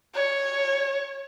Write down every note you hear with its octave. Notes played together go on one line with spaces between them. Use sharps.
C#5